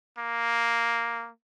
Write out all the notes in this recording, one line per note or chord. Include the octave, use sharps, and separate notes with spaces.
A#3